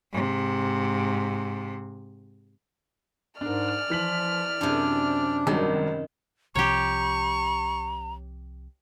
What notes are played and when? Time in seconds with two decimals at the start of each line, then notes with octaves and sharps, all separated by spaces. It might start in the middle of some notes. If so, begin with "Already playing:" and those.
0.12 G#2 C3
3.41 G#2 D4 A#4 D5 F6
3.90 E3 F3 B6 F#7
4.61 F#2 C3 D4
5.47 G#1 D#3 F#3 G3
6.55 C2 C3 F3 G4 C#5 A#5 C#6